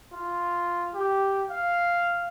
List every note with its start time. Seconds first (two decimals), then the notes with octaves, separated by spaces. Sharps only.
0.13 F4
0.95 G4
1.50 F5